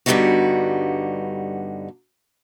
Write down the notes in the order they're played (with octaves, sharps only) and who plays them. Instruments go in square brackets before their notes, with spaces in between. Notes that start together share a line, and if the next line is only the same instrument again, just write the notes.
[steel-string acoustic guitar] G2 D3 G3 B3 D#4 F#4